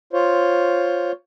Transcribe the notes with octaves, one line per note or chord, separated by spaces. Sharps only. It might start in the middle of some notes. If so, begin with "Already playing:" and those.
F4 C5 C#5